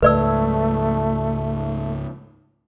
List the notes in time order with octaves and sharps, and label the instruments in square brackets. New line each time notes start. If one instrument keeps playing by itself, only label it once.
[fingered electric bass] C#2 G#2 [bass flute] A3 [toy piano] B4 D5 E6